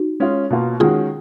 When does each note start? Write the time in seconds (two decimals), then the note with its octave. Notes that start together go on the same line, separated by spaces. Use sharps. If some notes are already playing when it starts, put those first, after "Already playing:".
Already playing: D#4 F#4
0.20 G#3 C#4 F4
0.50 B2 A#3 F4
0.80 D#3 G#3 C#4 F4 F#4 G#4